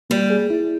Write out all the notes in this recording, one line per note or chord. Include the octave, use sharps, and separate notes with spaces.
G3 A#3
G#4
E4